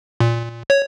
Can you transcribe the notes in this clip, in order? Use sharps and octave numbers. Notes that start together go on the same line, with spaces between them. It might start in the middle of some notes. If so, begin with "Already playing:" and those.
A#2
C#5